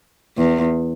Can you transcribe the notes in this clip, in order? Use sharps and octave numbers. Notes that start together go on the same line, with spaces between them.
E2